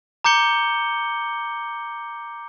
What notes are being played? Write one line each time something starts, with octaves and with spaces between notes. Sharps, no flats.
A#5 D6 G6 C#7 G7